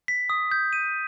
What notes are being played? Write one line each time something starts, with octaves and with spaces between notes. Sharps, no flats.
B6
D#6
G6
D#7